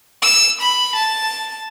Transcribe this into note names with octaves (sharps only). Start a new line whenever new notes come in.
E6
B5
A5